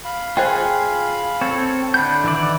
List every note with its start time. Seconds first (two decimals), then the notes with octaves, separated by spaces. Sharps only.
0.05 F5 B5
0.37 F4 G#4 C5 D#5 G5
1.41 C4 A4 C#5
1.94 D3 E4 F#5 G6
2.24 D#3 E3 D5